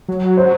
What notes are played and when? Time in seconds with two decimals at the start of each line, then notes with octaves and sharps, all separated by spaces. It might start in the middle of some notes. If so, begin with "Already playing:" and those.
0.08 F#3
0.37 C5